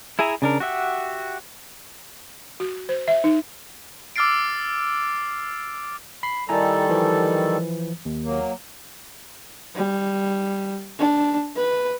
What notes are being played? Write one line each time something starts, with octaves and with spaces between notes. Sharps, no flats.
E4 G#4 E5 G#5 A#5
C#3 D4 A#4
F#4 G4 E5 F#5
F#4
C5
E5
D#4
D6 E6 F6 A6 C7 D7
B5 C7
D#3 G3 E4 A4 G#5 A#5
E3 F3
D#2
F#3 A#3
G3
D4
B4